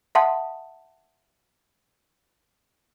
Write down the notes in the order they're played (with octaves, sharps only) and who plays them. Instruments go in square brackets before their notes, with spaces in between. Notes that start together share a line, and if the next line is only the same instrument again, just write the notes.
[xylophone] E5 F#5 A5 C6 D#6